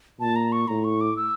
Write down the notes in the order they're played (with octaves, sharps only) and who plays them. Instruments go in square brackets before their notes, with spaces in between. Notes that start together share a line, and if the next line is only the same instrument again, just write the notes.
[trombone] A#2 [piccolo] A5
[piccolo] A#5
C#6
[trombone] A2 [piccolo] A#5
[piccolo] C#6
D6
E6